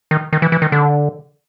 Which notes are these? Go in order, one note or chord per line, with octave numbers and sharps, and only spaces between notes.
D#3
D#3
E3
E3
D#3
D3